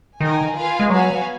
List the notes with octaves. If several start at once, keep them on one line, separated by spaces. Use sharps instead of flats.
D#3 D#4 A#4 D#5 G#5
F4 B4 F5 G#5
G#3
F#3 B3 F#4 B4 F5 G#5